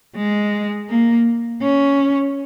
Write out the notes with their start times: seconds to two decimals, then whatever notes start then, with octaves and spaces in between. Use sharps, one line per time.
0.16 G#3
0.89 A#3
1.62 C#4